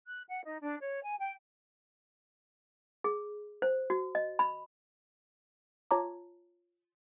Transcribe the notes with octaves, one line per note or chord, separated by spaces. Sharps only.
F#6
F#5
D#4
D4
C#5
G#5
G5
G#4
C5
F#4
D#5
B5
F4 C#5 A5 A#5 D6